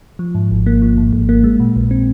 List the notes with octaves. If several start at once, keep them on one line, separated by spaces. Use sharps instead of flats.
F3
G#2
G#1
A#3
F3
G#2
G#1
A#3
G#3
A#2
A#1
C4